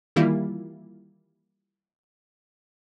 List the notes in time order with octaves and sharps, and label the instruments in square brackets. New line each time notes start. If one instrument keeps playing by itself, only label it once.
[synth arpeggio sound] D#3 E3 G3 A#3 E4 F4